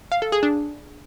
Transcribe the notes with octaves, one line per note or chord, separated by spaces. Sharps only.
F5
A4
G#4
D4